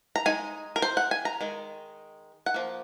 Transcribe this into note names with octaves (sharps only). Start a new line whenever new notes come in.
A#5
G#3 D#4 G#5
A#4
C5
F#5
G#5
A#5
D#3 G#3
F#5
F3 A#3